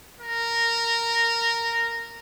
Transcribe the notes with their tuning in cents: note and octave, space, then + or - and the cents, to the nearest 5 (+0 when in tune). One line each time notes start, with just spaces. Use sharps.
A#4 -10